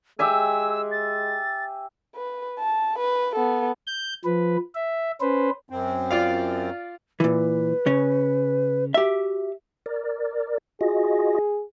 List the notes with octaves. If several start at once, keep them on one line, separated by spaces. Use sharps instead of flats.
G#3 G4 E5 G#5 E6
A6
B4
A5
B4
B3 A4
G6
F3 B4
E5
C#4 B4 C5
F#2 C4
F4 D5 F5
A#2 E3 B4
C#3 C#4
F#4 G4 E5
A#4 D5
F4 F#4 G#4 D#5